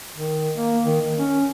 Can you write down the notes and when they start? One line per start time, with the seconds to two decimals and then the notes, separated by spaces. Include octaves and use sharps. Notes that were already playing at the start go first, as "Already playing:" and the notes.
0.16 D#3
0.57 A#3
0.85 D#3
1.01 D#3
1.18 C#4